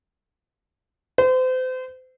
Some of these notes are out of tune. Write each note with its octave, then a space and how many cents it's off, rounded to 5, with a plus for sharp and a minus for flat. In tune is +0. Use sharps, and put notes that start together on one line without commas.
C5 -35